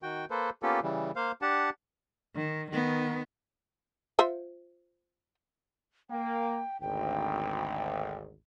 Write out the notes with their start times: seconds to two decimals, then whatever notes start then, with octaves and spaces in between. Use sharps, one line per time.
0.03 D#3 F#4 G5
0.30 A#3 A4 B4 C5
0.63 A#3 B3 C#4 F4 G4 A4
0.83 C#3 E3 G3
1.16 A#3 C5 F5
1.42 D4 G4 F#5 A5
2.35 D#3
2.71 D#3 B3
4.19 F4 C5 E5
6.10 A#3 G5
6.81 G#1 D2 G5